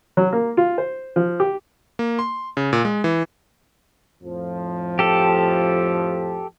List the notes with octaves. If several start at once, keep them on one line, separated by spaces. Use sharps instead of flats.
F#3
A#3
F4
C5
F3
G4
A#3
C6
C#3
A#2
G#3
E3
F2 A2 F3
G4 A4